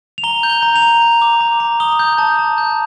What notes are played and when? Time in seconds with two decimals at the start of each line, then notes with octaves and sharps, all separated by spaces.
0.18 F7
0.24 A#5 G7
0.43 G6
0.50 G7
0.63 A#5
0.76 F7
0.82 A#5
1.02 A#5
1.22 D6
1.41 A#5
1.60 A#5
1.80 D#6 G7
1.99 G6
2.18 A5
2.39 A5
2.58 G6